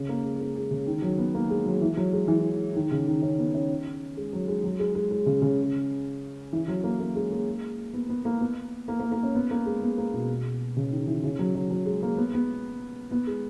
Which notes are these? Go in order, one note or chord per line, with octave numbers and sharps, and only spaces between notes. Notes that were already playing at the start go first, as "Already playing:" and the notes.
Already playing: C#3
A#3
G#3
G#3
A#3
G#3
C#3
D#3
F#3
B3
A#3
G#3
F#3
E3
F#3
G#3
E3
D#3
C#3
D#3
C#4
B3
C#4
G#3
F#3
G#3
F#3
G#3
G#3
G#3
C#3
C#3
E3
F#3
A#3
A#3
G#3
A#3
B3
B3
A#3
B3
A#3
A#3
A#3
C#4
B3
A#3
G#3
B3
A#3
B2
C#3
D#3
E3
C#3
F#3
F#3
F#3
G#3
A#3
B3
B3
B3
G#3